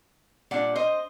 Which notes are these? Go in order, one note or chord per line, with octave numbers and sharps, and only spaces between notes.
A#2 G3 D4 D5 F#5
C5 D#5